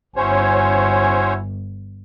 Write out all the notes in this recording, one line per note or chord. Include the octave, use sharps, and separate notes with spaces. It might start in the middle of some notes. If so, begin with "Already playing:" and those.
G1 C#4 E4 F#4 C5 C#5 G#5